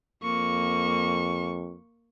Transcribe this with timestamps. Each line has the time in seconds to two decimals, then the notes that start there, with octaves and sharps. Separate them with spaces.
0.23 F2 A#3 C#6